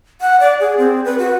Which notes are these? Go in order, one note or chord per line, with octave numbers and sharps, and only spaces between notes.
F#5
D5
G#4
C4
B4
F#4